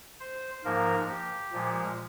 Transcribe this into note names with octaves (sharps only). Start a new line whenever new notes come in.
C5
G#2 F3 A#3 A#4
G4
A#2 F3 G#3